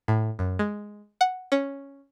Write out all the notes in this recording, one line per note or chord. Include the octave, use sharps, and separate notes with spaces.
A2
F#2
G#3
F#5
C#4